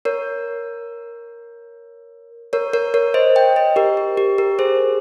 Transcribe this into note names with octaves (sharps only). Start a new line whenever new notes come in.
A#4 C#5
A#4 C#5
A#4 C#5
A#4 C#5
C5 D#5
D#5 G5
C5 D#5
G4 A#4
G4
G4
G4 A#4
G#4 C5